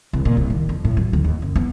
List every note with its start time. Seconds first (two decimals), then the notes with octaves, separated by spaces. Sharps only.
0.13 C2
0.25 A#2
0.37 C2
0.50 D#3
0.69 F2
0.85 A2
0.97 F#3
1.13 D2
1.24 D#2
1.42 F#2
1.55 B3